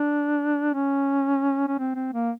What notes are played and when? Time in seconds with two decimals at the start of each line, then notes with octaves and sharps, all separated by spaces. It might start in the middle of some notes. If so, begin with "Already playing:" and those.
Already playing: D4
0.74 C#4
1.68 C#4
1.78 C4
1.95 C4
2.13 A#3